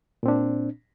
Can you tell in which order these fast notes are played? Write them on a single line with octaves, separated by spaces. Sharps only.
A#2 C4 D4